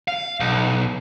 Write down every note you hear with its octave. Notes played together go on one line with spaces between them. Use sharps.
F5
B1